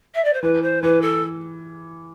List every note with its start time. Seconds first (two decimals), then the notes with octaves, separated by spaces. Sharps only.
0.15 E5
0.24 D5
0.33 C5
0.42 E3 B4
0.62 C5
0.82 E3 B4
1.01 A4